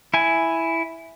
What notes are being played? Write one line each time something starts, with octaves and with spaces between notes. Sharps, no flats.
E4 G#5